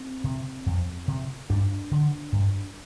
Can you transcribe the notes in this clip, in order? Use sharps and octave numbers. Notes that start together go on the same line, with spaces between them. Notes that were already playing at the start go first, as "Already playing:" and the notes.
Already playing: C4
C3
F2
C3
G2 D4
D3
G2